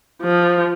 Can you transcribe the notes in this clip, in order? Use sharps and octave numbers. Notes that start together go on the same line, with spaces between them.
F3